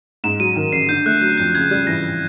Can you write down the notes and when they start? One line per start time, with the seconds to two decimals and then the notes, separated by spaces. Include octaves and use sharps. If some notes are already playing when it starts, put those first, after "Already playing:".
0.24 G#2 E7
0.40 F#3 D#7
0.56 D#3
0.72 A1 C7
0.89 D3 G6
1.06 A3 F#6
1.21 F#3 G6
1.38 F2 G6
1.55 C#3 G#6
1.71 G3
1.87 E3 A#6